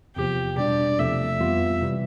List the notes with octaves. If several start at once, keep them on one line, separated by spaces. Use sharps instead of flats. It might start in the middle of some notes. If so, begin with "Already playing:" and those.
E2 C3 F3 G4
B2 G3 D4 D5
E2 C3 F3 A3 E5
F2 E3 G3 B3 F4
C3 E3 G3